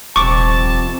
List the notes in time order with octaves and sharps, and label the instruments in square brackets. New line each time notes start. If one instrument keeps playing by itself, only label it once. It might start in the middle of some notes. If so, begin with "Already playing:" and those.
[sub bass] D#1 [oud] F2 C3 [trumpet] A5 [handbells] C#6 D6